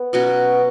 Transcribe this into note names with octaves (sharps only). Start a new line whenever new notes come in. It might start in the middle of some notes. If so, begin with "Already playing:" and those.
Already playing: B3
B2 F#3 C#4 F#4